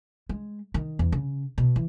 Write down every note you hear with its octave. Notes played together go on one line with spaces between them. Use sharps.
G#3
D#3
E2
C#3
B2
E3